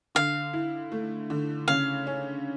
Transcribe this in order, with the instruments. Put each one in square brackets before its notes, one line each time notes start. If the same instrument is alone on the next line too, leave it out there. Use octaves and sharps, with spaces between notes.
[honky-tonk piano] D3 [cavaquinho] F5
[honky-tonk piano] E4
A3
D3
[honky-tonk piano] C#3 [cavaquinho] F5
[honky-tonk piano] C#4